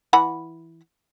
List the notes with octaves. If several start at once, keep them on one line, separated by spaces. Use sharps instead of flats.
E3 F#5 B5